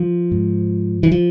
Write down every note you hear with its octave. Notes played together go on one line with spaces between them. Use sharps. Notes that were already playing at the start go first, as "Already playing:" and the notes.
Already playing: F3
G#2
E3
F3